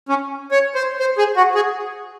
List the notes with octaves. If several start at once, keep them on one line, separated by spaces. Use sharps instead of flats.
C#4
C#5
C5
C5
G#4
F#4
G#4